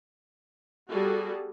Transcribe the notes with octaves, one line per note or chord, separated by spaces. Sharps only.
G3 B3 F#4 G#4 A4